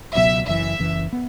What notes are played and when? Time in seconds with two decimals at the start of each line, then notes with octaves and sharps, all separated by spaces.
0.15 C#2 B2 F#3 B3 E5
0.47 F#1 F#2 E3 E5
0.80 F#1 F#2 E3
1.13 B3